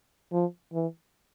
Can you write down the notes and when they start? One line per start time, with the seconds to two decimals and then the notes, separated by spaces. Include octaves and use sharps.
0.32 F3
0.73 E3